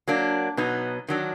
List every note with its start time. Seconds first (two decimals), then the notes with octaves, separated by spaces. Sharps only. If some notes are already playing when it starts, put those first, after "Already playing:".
0.08 F#3 A#3 D4
0.57 B2 F#3 B3 D#4
1.08 D#3 F#3 D4